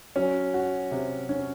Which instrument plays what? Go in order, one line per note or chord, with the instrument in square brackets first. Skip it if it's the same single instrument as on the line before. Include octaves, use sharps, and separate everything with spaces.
[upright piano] F#3 [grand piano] C#4
[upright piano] F#4
C3
C#4